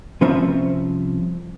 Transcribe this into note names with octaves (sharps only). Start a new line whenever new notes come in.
C2 F3 C4 C#4 E5 A#5